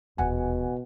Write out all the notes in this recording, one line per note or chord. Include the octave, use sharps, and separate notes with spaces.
D#1 E2 B2 F#5 G#5